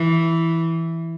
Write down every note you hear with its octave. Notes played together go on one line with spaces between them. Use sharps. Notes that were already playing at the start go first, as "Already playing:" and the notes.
Already playing: E3